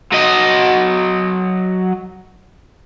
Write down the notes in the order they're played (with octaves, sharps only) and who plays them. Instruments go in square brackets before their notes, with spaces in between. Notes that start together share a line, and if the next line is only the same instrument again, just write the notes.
[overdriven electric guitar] F#3 D#5